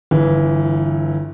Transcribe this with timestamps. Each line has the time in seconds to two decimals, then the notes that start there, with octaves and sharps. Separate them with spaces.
0.11 G1 E3